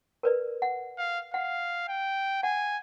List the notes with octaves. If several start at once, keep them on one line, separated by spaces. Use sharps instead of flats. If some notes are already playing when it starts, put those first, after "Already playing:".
A#4 B4 D5
F#5
F5
F5 F#5
G5
F#5 G#5